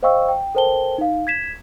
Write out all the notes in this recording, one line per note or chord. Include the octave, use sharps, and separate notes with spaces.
C5 D#5 F5 G5 C#6 E6
G5
A4 A#4 C5 G5 A5 G7
D#4 F5
G#6 B6 E7